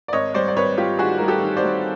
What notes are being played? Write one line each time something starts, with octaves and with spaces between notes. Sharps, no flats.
D5
G#1 C#5 D#5
G3 C5 D5
D5
G#1 B4 C#5
G3 F4 G4
D#3 F#4 G#4
G3 A#4
G4 A4
D#3
C5 D5
G3